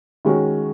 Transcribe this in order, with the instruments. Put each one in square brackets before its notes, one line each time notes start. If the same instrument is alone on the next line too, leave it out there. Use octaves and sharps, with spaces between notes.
[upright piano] D#3 G#3 C#4 F#4